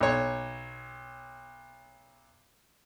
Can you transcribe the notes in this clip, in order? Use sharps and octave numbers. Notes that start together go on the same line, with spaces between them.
B1 C#5